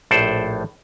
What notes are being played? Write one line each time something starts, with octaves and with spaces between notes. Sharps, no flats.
A#1 A2 A4 C5 D5